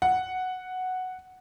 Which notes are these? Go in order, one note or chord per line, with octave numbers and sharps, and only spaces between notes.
F#5